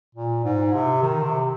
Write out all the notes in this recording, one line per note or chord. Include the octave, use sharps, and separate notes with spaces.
A#2
G#2
C3
D#3
C3